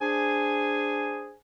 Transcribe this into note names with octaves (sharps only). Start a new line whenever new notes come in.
D4 G#4 C5 G#5